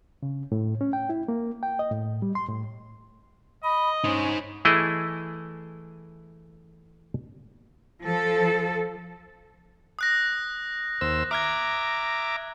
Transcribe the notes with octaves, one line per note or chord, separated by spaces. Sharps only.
C#3
A2
C#4
G5
E4
A#3
G5
D#5
A2
G3
C6
A2
D#5 B5
C#4 D#4 C5
E3 A3 E4 G#4 D#5
F3 A4
D#6 F#6 A#6
D#2 C5 E6
E5 A#5 D6 D#6 F6 G#6